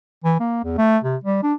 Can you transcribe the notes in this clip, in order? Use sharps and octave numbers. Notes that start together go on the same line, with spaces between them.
E3
A#3
E2
A3
C3
G3
D4